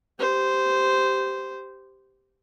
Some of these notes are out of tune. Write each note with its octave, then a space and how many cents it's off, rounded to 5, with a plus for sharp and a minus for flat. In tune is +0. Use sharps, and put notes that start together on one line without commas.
G4 -5 C5 -10